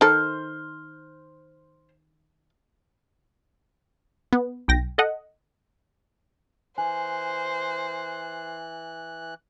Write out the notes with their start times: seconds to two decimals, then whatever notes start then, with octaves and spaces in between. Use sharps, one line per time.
0.01 D#3 A4 C5 F6
4.33 B3
4.68 B1 G5 A#6
4.98 A4 D#5 F#5
6.78 E3 C5 G#5 F#6